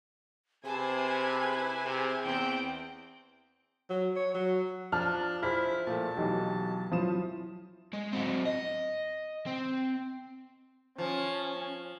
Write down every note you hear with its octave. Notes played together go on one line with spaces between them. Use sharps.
C3 G#4 B4 C5 G#5 A5
E4
C3
E2 C4 G5
F#3
C#5
F#3
F3 D4 A5 F6
E4 G#4 C5 F6 B6
A#2 F3 A3 A5
B1 E3 F#3 D#4 G4
F3 F#3 E4 F4 D#6 E7
G#3
F#3 C4
D#5
C4
F3 C#4